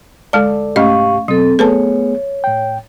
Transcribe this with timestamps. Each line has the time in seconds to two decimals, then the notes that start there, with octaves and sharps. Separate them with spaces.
0.33 D2 G#3 A4 D5 A5
0.76 C2 G#2 A3 C#4 G4 D#5 F5 C#6
1.28 B2 F#3 C4 A4
1.59 A3 B3 G#4 A4 B4 C#5 A5
2.44 A2 G5